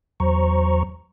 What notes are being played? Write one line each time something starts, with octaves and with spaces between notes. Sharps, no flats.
E2 F#3 C5 A#5 C#6